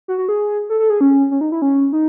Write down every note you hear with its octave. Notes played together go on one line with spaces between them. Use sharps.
F#4
F#4
G#4
A4
A4
G#4
C#4
C#4
D#4
E4
C#4
D#4